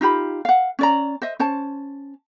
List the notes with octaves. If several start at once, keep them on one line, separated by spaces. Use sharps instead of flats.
D#4 F4 G4 B5
F5 F#5
C#4 D5 A#5
C5 D#5 E5
C#4 C5 A5